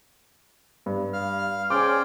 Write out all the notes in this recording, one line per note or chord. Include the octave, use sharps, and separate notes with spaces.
G2
F5 F6
C#4 G#4 C5 D5 G5 D6 F6